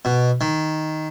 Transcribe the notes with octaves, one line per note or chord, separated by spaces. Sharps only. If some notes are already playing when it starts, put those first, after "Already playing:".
B2
D#3